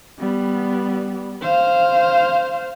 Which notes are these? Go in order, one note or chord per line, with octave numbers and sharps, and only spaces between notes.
G3 B3
C5 F5